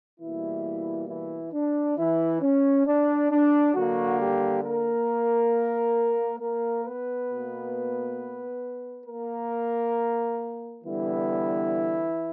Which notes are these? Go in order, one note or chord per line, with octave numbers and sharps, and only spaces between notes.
B2 E3 G3 A#3 E4
E3 E4
D4
E3 E4
C#4
D4
D4
D3 F#3 A#3 F#4
G3 G4
A#3 A#4
A#3 A#4
B3 B4
B2 A#3
A#3 A#4
D3 E3 G3 B3 E4